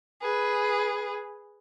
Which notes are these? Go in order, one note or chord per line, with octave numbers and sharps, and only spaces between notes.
G#4 B4